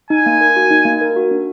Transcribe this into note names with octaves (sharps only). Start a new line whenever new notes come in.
D#4 G#5
A#3
A#4
F#4
D#4
A#3
A#4
F#4
D4